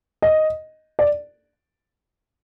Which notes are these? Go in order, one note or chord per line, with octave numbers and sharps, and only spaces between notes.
D#5
D5